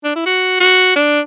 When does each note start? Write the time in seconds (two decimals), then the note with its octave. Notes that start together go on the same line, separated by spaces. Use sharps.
0.04 D4
0.15 E4
0.26 F#4
0.60 F#4
0.96 D4